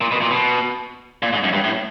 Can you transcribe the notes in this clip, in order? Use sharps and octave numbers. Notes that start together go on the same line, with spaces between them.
A#2
B2
A#2
B2
A#2
G#2
F#2
G2
A2